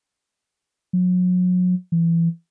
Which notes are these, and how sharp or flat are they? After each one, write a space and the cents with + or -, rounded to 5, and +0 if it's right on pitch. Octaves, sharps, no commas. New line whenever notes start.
F#3 -35
E3 +25